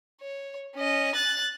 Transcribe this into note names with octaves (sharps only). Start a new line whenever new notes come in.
C#5
C#4 D#5
F#6 A6